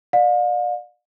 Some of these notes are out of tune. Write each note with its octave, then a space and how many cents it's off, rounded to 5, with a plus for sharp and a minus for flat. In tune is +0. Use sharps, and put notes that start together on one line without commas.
D5 +35 F5 +40